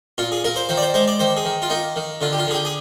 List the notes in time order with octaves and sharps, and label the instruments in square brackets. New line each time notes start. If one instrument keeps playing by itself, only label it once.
[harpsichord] A#2 F4
G#4
A#2 A#4
C5
D#3 C5
D5
C5
G#3 C5
D5
D#3 C5
G#4
D#3
F4
A#3 D#4
D#3
D3 F4
G4
F4
D3 G#4
G4
G#4